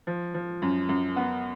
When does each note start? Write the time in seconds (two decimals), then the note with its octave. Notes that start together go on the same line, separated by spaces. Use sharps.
0.07 F3
0.34 F3
0.62 F#2
0.89 F#2
1.16 B3